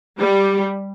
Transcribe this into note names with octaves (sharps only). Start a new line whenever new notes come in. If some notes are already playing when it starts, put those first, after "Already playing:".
G3